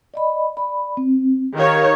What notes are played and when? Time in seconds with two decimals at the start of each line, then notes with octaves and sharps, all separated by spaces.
0.14 D5 D#5 B5
0.57 D5 B5
0.97 C4
1.53 D#3 G4 A#4 C#5 F5